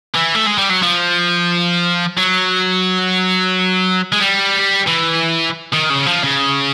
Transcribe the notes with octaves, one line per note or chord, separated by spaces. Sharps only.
E3
A3
G#3
G3
F#3
F3
F#3
G#3
G3
E3
D#3
C#3
F3
C#3